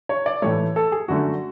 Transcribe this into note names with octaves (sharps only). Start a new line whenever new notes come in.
C#5
D5
A2 E3 A3 C#5
A4
G#4
F#2 D3 A3 F#4